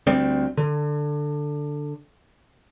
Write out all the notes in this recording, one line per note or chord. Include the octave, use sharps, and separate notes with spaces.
D2 G3 C4
D3